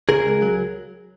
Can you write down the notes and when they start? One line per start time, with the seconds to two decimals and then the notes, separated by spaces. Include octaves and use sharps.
0.09 C#3 G#4 A#4
0.26 C#2
0.42 F#3